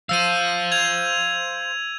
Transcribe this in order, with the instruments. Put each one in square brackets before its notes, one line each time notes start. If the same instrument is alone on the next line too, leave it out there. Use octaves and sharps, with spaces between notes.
[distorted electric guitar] C5 F5 [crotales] E6 D#7
[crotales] G#6 F7